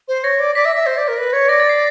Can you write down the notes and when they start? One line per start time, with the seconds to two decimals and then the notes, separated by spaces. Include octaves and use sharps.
0.08 C5
0.24 C#5 A#6
0.40 D5
0.55 D5 B6
0.65 E5
0.76 E5
0.86 C5
0.97 D5
1.08 A#4
1.18 B4
1.33 C#5
1.48 D5 A#6
1.60 A6
1.69 C7